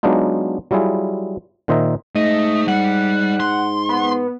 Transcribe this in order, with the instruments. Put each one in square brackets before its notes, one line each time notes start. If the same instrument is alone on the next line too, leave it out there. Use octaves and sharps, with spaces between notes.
[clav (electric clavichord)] F#3 G#3 B3 D4 D#4 F4
F#3 G3 E4 F4 G#4
A#2 D#3 C5 D#5 E5 A#5
[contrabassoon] G#2 [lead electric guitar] A3 [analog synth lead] D#5
[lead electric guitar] G3 [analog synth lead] F#5
[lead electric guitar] C6
[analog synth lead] B3